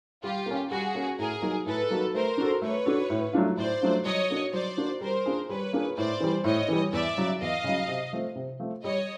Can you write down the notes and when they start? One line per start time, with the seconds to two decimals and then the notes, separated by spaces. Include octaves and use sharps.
0.23 G3 F4 G4
0.46 A#3 C#4
0.70 G3 F#4 G#4
0.95 A#3 C#4
1.18 A2 G#4 A#4
1.42 F#3 A#3 D#4 F#4
1.66 A2 A4 B4
1.90 F#3 A#3 D#4 F#4
2.14 A3 A#4 C5
2.38 D4 F#4 A4
2.62 A3 B4 C#5
2.86 D4 F#4 A4
3.10 A2
3.33 F#3 A3 D4 F4
3.57 A2 C5 D5
3.82 F#3 A3 D4 F4
4.05 F#3 C#5 D#5
4.30 A#3 D4 F#4
4.53 F#3 C5 D5
4.77 A#3 D4 F#4
5.01 G3 A#4 C5
5.26 A#3 D4 F4 G#4
5.49 G3 B4 C#5
5.73 A#3 D4 F4 G#4
5.96 A2 C5 D5
6.20 E3 G3
6.44 A2 C#5 D#5
6.68 E3 G3
6.93 E2 D5 E5
7.17 C#3 F#3
7.41 E2 D#5 F5
7.64 C#3 F#3
7.88 C3
8.13 F3 A3 C4
8.36 C3
8.60 F3 A3 C4
8.84 G3 C#5 D#5